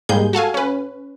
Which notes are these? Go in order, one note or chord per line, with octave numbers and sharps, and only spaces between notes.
G#2 G3 G#3 A#3 G#4 G6
F#4 A4 F5 G#5
C#4 B4